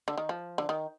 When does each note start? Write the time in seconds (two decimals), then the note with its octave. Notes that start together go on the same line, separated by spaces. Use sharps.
0.08 D3
0.18 D#3
0.29 F3
0.58 D3
0.69 D#3